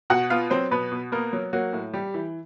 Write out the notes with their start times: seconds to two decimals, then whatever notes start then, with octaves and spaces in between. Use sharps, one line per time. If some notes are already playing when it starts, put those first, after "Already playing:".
0.10 B2 F#4 F#5
0.30 B3 F4 F5
0.50 F#3 C4 C5
0.71 B2 B3 B4
0.92 B2
1.12 A#3 B3 A#4
1.33 F#3
1.53 F#3 A#3 F#4
1.73 A2
1.94 G3 G4
2.14 E3